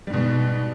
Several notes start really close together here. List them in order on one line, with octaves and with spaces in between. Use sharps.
G3 G#2 B2